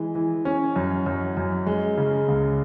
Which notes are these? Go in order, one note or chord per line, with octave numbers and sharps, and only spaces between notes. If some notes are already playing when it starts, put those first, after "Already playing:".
Already playing: E3 G#3
E3
C#4
F#2
F#2
F#2
G#3
C#3
C#2